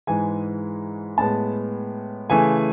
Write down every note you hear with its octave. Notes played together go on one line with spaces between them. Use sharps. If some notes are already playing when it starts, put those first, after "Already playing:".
G#2 E3 G#3 G#5
A2 G#3 B3 A5
C#3 E3 A3 G#5